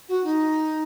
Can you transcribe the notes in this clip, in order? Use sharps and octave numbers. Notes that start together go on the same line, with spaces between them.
F#4
D#4